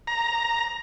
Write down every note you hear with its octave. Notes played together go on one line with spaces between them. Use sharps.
A#5